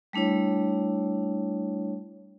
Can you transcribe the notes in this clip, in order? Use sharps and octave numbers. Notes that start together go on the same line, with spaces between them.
G3 A3 D4 E4 C#5